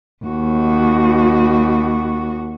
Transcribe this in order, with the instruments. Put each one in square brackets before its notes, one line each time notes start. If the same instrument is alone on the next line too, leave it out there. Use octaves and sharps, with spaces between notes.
[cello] D#2 F#4